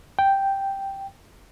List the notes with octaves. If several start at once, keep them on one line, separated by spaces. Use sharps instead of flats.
G5